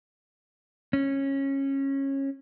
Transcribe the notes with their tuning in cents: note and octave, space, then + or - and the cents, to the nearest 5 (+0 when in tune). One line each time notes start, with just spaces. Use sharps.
C#4 -20